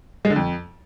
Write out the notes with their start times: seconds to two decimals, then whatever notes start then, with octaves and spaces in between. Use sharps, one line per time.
0.25 G#3
0.30 D3
0.36 F2